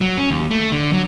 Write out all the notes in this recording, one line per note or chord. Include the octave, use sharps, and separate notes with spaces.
F#3
C#4
D#2
A3
D3
F#3